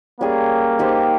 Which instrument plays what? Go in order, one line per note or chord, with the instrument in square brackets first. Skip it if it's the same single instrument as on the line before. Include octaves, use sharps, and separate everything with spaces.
[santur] G3 C#4 G#4 [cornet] A#3
[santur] D#4 G4 C5